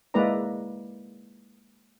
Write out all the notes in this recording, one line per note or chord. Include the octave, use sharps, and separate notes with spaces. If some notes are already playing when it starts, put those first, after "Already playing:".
G#3 A#3 E4 B4 D5 A#5